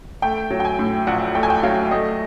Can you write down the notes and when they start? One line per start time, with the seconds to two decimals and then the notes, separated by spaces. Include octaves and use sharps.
0.22 A3 G5
0.50 F#3
0.60 G5
0.65 G#5
0.79 A2
1.07 A#1 F#5
1.35 A3 G5
1.43 G#5
1.50 G5
1.63 F#3 F5
1.91 A3 D#5